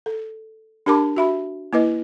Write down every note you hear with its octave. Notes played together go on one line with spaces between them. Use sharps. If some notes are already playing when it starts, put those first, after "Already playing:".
A4
D4 G4 A#4 A5 B5 D6
F#4 E5 B5
A#3 E4 B4 D#5